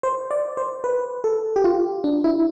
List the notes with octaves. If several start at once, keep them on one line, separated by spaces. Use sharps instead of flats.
C5
D5
C5
B4
A4
G4
F4
D4
E4